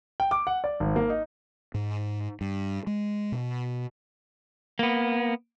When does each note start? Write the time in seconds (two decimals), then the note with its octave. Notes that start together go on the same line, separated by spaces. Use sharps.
0.20 G5
0.31 D6
0.47 F#5
0.64 D5
0.80 G#1
0.96 A#3
1.10 D#4
1.74 G#2
2.41 G2
2.87 G#3
3.32 B2
4.79 A#3 B3